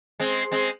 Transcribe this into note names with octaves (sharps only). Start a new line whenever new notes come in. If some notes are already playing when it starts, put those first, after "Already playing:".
G#3 C4
G#3 C4